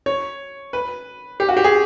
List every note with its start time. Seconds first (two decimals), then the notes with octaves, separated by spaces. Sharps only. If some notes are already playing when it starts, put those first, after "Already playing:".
0.06 C#5
0.73 B4
1.40 G4
1.49 F#4
1.57 G4
1.64 G#4